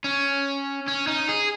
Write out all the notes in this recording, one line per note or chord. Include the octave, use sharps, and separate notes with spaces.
C#4
C#4
D#4
G#4